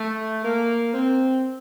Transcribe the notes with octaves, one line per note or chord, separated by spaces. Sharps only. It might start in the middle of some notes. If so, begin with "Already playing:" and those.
Already playing: A3
A#3
C4